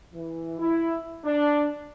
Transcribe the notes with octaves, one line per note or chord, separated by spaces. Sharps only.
E3
E4
D4